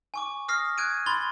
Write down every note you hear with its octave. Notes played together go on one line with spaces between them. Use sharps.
G#5 C#6 D6
D#6 F6 A#6 C7
F#6 G#6 D7 D#7
B5 C6 A6 G7